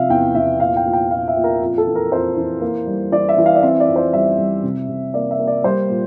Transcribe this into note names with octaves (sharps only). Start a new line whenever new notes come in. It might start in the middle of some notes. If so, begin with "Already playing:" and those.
Already playing: C3 F3 E5 F5
E2 G5
E2 E5
A#2 F5
G5
A#2
G5
A#2 F5
E5
A#2
A#4
F2
A4
E3
A#4
F2 C5
E3
A#3
G3
E3 D5
E5
E3
F5
D5
C4 E5
D5
F2
C5
G3 E5
G3
C3
C3
A#3 D5
E5
A#3
D5
G3 C5
A#2